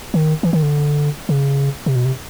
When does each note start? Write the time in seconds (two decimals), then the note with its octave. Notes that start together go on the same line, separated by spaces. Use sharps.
0.14 D#3
0.43 E3
0.53 D#3
0.63 D3
1.29 C#3
1.86 C3
1.96 B2
2.05 C3